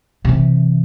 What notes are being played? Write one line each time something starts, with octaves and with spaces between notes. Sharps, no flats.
C3 E3